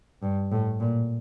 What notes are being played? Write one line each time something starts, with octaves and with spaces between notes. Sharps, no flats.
G2
A2
A#2